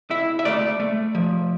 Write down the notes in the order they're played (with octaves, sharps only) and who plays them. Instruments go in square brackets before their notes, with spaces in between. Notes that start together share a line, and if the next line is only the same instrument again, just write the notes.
[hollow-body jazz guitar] E4 E5
E5
A3 D5
A3
F3